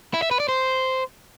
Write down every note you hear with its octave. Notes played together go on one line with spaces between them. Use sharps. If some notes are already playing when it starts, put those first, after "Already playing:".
E4
E5
B4
D5
C5